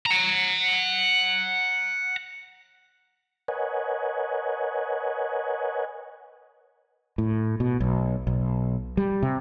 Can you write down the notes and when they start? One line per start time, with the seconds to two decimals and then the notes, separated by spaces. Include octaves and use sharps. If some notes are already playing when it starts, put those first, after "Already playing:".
0.06 F#5 A#5
3.48 A#4 B4 C#5 D#5 F#5 G#5
7.18 A2
7.60 B2
7.80 B1
8.27 B1
8.97 G3
9.23 C3